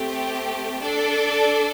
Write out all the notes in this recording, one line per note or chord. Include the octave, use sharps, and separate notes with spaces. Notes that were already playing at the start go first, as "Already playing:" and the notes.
Already playing: A3 C4 G4
D4 A4 D5